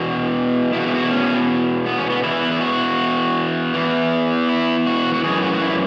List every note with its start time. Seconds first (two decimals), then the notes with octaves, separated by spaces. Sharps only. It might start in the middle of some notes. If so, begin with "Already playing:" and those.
Already playing: E2 B2 F#4
0.73 E2 B2 E4
0.81 F#4
0.87 E4
0.95 F#4
1.02 E4
1.11 C#4
1.86 B3
1.98 C#4
2.10 B3
2.23 E2 E3 E4
2.52 E4
2.61 F#4
3.74 E2 E3
4.49 E4
4.87 F#4
5.14 F#4
5.23 F#2 E3 G#4
5.43 F#4
5.53 F#4
5.61 E4